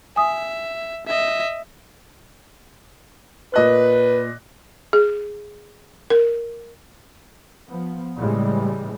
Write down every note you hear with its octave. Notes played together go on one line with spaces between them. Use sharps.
E5 G#5 D#6
D#5 E5
A#2 B4 D#5 F#6
G#4
A#4
F3 B3
A2 C#3 E3 G3 G#3